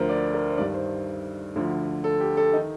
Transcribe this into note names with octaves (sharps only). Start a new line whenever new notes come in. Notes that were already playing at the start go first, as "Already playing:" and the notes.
Already playing: D2 D3 F3 A#4 C5
D5
A#4
C5
G2 D#3 D5
C5
D2 D3 F3
A4
G4
A4
D#4
D#3